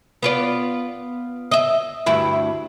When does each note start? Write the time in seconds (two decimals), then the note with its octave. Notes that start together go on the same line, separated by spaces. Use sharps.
0.23 B3 F4 D5
1.51 D#5 E5
2.06 D2 G2 E4